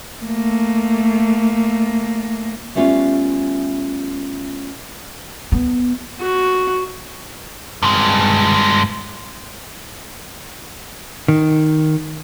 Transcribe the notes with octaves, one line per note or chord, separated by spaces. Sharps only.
A3 A#3
G3 A3 B3 C#4 F4
B3
F#4
G2 G#3
D#3